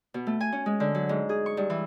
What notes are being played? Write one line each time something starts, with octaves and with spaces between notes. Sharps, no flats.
B2
A3
G#5
C#4
G#3
D3
F#3
G#2
G#4
C#6
G2
E3